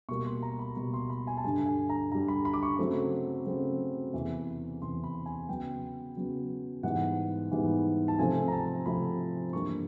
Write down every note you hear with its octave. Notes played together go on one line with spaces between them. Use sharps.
B2 G3 A#3 C#6
C6
A#5
B5
B2 G3 A#3 B5
C6
B5
G#5
A5
G2 D3 G3 G#5
G#5
A#5
G2 D3 G3 A#5
B5
B5
D6
C#6
C#3 F#3 A3 C4
C#3 F#3 A3 C4
E2 C3 E3
E2 C3 E3 C6
B5
G#5
C#3 F#3 B3 G5
C#3 F#3 B3
G#2 E3 G3 B3 F#5
G#2 E3 G3 B3
A5
C3 F3 A3 C4 G#5
A#5
A5
C3 F3 A3 C4 B5
G2 E3 G3 A#3 C#6